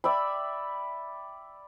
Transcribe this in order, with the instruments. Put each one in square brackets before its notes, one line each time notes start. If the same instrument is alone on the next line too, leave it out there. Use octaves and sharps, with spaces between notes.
[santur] D5 E5 G5 B5